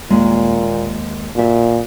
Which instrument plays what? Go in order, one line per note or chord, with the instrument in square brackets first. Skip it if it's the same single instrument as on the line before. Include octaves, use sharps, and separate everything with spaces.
[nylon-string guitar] D#2 G#3 A#3 [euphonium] A#2
[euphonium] A#2 [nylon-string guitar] F#4 E5